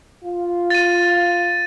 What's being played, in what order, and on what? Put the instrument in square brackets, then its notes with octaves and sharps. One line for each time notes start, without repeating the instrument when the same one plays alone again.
[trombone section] F4
[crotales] A6 D#7